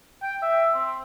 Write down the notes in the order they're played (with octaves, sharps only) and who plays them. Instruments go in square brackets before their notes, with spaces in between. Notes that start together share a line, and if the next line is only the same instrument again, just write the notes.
[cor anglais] G5
E5
C4